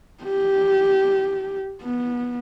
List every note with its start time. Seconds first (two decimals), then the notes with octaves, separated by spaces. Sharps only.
0.23 G4
1.83 B3